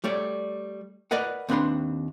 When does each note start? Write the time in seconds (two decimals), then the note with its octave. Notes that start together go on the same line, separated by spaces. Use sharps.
0.04 G3 A3 C#5 D5
1.11 A#4 B4 D5 D#5 F#5
1.49 D#2 C4 D4 B4 B5 C6